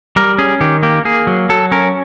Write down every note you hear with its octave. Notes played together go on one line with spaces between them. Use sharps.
G3 A#4
C#4 G#4
D#3 G4
A#3 G4
A#3 G#4
F#3
F#3 A4
C#4 A#4